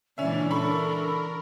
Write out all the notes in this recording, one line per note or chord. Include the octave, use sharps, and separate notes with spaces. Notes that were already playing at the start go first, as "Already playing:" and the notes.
A#2 C#3 E3 G#3 C#4 D4 D5 E5
D4 A4 A#4 B5 C#6